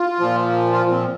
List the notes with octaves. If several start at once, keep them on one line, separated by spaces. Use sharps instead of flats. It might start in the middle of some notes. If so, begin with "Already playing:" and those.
Already playing: F4
A#2 F3
F4
C4